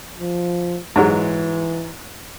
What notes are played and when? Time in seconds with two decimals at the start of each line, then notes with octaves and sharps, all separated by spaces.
0.20 F3
0.96 G#2 E3 F#3 G#3